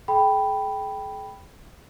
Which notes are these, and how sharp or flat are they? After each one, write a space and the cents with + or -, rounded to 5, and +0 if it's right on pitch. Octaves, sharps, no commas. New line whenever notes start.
G#4 +45 G5 +0 B5 +0